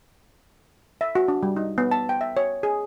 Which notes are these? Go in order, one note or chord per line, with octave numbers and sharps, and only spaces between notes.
E5
F#4
D4
G3
D#4
B3
A5
G5
E5
C#5
G#4